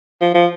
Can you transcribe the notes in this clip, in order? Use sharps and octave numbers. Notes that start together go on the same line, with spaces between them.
F3
F3